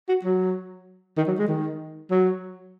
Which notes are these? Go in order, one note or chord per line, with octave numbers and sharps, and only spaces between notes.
F#4
F#3
D#3
F#3
G#3
D#3
F#3